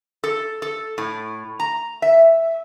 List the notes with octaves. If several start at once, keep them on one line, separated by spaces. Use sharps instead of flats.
A4
A4
A2
A#5
E5